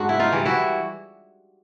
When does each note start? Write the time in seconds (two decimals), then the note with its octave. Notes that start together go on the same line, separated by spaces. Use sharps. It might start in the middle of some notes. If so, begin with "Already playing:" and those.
Already playing: G#2 D4 F#4
0.09 E4
0.19 D#4 F4
0.32 E3 G3
0.46 E4 F#4